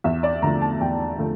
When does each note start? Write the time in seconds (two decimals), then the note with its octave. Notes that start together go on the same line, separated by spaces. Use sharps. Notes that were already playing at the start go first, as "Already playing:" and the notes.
0.04 E2 E5
0.23 D5
0.42 D3 F3 A3 A#5
0.61 A5
0.80 E2 G5
1.19 D3 F3 A3